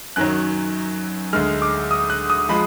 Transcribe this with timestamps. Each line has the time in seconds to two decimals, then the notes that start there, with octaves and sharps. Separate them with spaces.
0.16 F#2 D#3 F#3 F#6
1.33 D2 D3 G#3 F6
1.62 D6
1.91 D#6
2.10 F#6
2.30 D#6
2.49 F3 G#3 B5